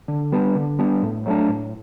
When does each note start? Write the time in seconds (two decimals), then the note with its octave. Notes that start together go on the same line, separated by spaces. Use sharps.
0.08 D3
0.32 G3 B3 D4
0.55 D3
0.79 G3 B3 D4
1.03 A2
1.26 F#3 A3 D4
1.49 A2